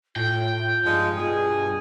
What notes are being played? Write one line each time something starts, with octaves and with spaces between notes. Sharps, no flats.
A2 F4 G5
G2 F3 G#3 D#4
B2 G#4